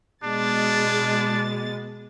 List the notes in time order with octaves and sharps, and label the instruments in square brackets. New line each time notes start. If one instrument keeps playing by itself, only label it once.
[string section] B2 G#3 A6 [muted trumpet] D4